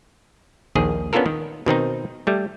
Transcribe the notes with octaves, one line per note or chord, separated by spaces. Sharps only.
A#1 D#2 D#3 G#4
B3 C#4 D4 F4 A4 A#4
D#3
B2 D#3 C4 D#4
G3 A3